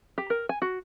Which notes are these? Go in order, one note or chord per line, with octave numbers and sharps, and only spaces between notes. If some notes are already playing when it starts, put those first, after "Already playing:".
G4
A#4
G#5
F#4